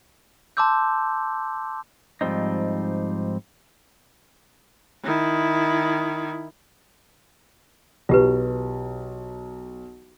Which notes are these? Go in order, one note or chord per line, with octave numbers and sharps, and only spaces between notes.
A5 C6 D6 E6 G6
G#2 F3 G3 C4 D#4
D#3 E4
B1 F4 G4 B4